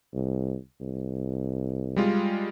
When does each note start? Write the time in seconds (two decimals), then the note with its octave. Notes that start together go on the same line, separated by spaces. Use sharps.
0.13 C2
0.81 C2
1.96 G3 G#3 F4